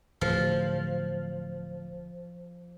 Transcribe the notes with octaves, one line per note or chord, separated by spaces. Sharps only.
D1 F3